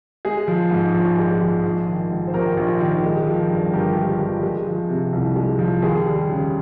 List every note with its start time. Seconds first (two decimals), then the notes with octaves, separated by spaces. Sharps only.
0.25 G#3 G#4
0.48 F3
0.71 G#2
0.94 A#1
1.18 G#3
1.41 F3
1.64 A#1
1.87 D#3
2.11 G#2
2.27 C5
2.33 A#1 G4 A#4
2.57 A#1
2.80 D#3
3.03 G#3
3.27 F3
3.50 G2
3.73 G1 G4 A#4
3.96 G#3
4.20 F3
4.43 G#3
4.66 F3
4.89 C3
5.13 C2
5.36 G#3
5.59 F3
5.82 D#2 G#4
6.05 G3
6.29 C#3